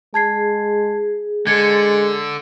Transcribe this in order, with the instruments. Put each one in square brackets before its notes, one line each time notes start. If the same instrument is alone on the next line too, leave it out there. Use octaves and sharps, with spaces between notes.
[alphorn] G#3 [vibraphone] G#4 [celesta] A5 G#6 C7
[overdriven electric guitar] D3 [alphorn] G#3 [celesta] G#6 A6 C#7